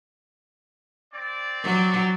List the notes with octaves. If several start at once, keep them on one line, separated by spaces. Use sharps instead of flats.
C4 D5
F#3